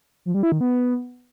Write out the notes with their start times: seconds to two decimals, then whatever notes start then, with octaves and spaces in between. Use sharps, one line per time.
0.26 F3
0.34 G3
0.43 E4
0.52 D#3
0.61 B3